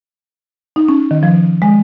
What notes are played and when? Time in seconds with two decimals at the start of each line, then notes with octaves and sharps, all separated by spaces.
0.76 D#4
0.88 C#4
1.11 D#3
1.23 F3
1.62 G#3